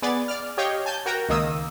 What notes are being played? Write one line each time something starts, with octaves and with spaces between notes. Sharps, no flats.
B3 G#4 D5 A6
D5 F6
G4 C#5 D#5 F5 G5
G#5 A5 G6
F#4 A#4 G5 A#5
C#2 D#3 A#3 D#6 E6